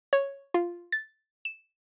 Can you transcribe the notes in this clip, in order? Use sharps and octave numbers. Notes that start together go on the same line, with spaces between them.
C#5
F4
A6
E7